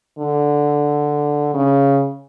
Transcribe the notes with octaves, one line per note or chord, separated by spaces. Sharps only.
D3
C#3